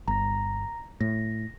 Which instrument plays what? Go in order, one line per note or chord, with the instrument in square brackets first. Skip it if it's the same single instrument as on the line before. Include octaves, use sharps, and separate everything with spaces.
[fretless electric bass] G1 [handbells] A#5 A#6
[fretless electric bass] A2 [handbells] A#6